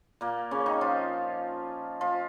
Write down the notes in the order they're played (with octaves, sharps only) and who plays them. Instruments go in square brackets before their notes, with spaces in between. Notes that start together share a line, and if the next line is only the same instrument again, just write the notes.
[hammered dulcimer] A#2 A#3
C#3 C#4
D#3 D#4
F3 F4
F3 F4